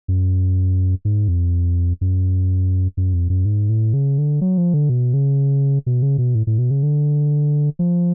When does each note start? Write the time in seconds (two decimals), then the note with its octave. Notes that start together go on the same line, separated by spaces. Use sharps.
0.08 F#2
1.05 G#2
1.28 F2
2.01 F#2
2.97 F#2
3.13 F2
3.30 F#2
3.45 G#2
3.69 A2
3.93 C#3
4.18 D3
4.41 F#3
4.58 F3
4.74 D3
4.89 B2
5.14 C#3
5.86 B2
6.02 C#3
6.18 B2
6.35 A2
6.47 A2
6.58 B2
6.71 C#3
6.83 D3
7.79 F3